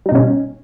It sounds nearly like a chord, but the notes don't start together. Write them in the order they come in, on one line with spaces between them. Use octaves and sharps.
G3 D#4 B2 C#4